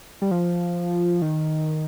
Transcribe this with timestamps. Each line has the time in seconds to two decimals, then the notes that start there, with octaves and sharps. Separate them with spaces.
0.22 G3
0.31 F3
1.22 D#3